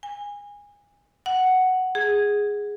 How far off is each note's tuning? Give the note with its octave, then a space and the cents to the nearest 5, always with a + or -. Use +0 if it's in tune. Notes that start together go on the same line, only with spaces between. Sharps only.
G#5 -25
F#5 +5
G#4 -5